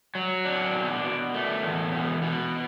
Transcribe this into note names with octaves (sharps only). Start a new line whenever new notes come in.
F#3
D4
B2
B2
A3
E2
B2
B2